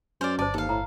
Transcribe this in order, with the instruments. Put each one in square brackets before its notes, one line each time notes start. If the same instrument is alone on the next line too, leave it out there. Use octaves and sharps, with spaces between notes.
[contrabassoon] F#2 [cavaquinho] C5 D5 [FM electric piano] G#5 F6
[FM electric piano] G1 [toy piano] C5 A5 [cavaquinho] D5
[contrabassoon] D#2 [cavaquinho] A4 F5
[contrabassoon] A2 [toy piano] A#5